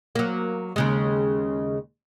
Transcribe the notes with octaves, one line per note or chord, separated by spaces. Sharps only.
F#3 A#3
D#2 C#3 G#3